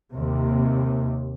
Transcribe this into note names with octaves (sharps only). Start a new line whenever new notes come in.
D#2 C3